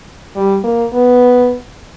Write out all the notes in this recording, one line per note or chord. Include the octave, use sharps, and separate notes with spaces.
G3
A#3
B3